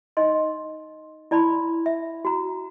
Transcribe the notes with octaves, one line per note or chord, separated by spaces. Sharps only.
D#4 D#5 C6
E4 D5 A5 B5 C6
E5
F#4 A#5